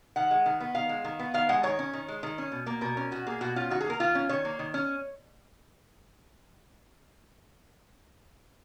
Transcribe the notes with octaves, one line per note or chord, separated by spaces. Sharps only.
D#3 F#5
G#3
D#3
B3
D#3 F5
G#3
D#3
B3
D#3 F5
G#3 F#5
D#3 C#5
C#4
D#3
G#3
D#3
C#4
B2
A#3
B2 A#4
C#4
B2 F#4
A#3 G#4
B2 F#4
C#4 F4
D#3 F#4
G#4
A#3 A#4
D#3 F4
C#4
D#3 C#5
A#3
D#3
C#4